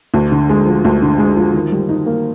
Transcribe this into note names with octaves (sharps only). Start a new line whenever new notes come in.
D2
D3
G#3
F3
D2
D3
G#3
F3
D#3
G3
D#4
A#3